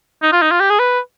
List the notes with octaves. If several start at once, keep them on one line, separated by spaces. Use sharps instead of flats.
D#4
F4
D#4
F4
G4
G#4
B4